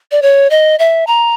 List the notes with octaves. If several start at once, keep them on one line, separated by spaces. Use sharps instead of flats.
D5
C#5
D#5
E5
A#5